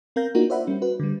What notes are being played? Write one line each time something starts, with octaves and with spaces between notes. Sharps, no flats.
C4 A#4 F5 G6 A#6
A#3 D4 D#4 F4 F#4 A#4
C5 D5 E5 F#5 B5
G3 C#4
F#4 B4
D3 G3